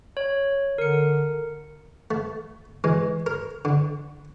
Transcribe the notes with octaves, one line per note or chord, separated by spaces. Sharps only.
C#5
D3 A#4 C#7
A3
E3 G#3
A#4
D3